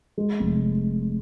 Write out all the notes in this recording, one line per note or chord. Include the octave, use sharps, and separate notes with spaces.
G#3
F1